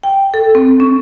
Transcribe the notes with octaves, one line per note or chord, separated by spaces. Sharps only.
G5
A4
C4
C#4